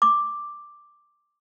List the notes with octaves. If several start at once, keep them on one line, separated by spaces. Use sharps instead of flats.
D6